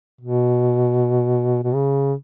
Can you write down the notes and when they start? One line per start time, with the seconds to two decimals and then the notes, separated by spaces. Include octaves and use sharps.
0.21 B2
1.63 B2
1.74 C#3